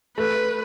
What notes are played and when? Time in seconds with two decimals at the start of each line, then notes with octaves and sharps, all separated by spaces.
0.18 A3 B4